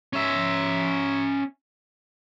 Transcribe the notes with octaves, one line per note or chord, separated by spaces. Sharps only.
C#4 E5